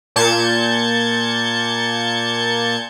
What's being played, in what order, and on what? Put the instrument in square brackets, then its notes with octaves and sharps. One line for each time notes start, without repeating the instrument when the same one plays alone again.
[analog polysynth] A#2 A5 G6 G#6 C#7